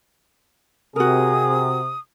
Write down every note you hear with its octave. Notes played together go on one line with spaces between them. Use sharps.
C3 F#4 G#4 A#4 D#6